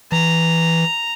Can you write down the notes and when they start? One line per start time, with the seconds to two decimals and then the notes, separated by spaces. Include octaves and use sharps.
0.12 E3 A#5